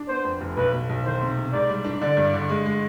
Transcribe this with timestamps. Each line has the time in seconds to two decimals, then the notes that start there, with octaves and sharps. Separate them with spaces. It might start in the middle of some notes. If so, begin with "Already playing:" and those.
Already playing: D4
0.08 B3 C5
0.24 F2
0.41 F1
0.57 B1 B4
0.72 B2
0.89 B1
1.05 D#3 C5
1.21 C3
1.37 C3
1.52 G#2 D5
1.69 G3
1.84 D4
2.01 D3 D5
2.17 G2
2.33 D3
2.49 G#3
2.66 G#3